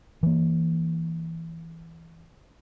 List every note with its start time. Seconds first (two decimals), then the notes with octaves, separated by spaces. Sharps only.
0.23 E3 A#3